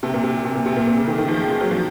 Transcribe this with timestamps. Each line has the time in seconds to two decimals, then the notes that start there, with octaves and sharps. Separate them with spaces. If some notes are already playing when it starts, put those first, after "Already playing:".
0.03 C3
0.14 A#2
0.24 C3
0.45 C3
0.55 A#2
0.66 C3
0.77 A#2
0.87 A#2
0.97 C#3
1.08 D#3
1.18 D#3
1.28 F3
1.39 G#3
1.50 G#3
1.61 F#3
1.71 F3